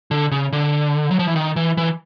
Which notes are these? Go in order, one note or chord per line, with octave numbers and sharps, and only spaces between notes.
D3
C#3
D3
F#3
F3
E3
D#3
E3
E3